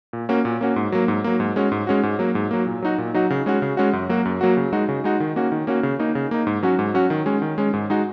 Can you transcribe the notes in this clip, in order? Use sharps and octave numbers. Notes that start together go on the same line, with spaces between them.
A#2
A#3 C#4 F#4
A#2
A#3 C#4 F#4
G#2
F#3 A#3
G#2
F#3 A#3
G#2
G#3 C#4 F#4
G#2
G#3 C#4 F#4
G#2
F#3 A#3
G#2
F#3 A#3
A#2
F#3 D#4 F#4
A#2
F#3 D#4 F#4
C#3
G#3 C#4 F#4
C#3
G#3 C#4 F#4
F#2
F#3 A#3 F#4
F#2
F#3 A#3 F#4
C#3
G#3 D#4 F#4
C#3
G#3 D#4 F#4
D#3
A#3 C#4 F#4
D#3
A#3 C#4 F#4
C#3
A#3 D#4
C#3
A#3 D#4
G#2
F#3 C#4 F#4
G#2
F#3 C#4 F#4
D#3
G#3 C#4
D#3
G#3 C#4
G#2
G#3 D#4 F#4